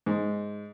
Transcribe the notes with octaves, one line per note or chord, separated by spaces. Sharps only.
G#2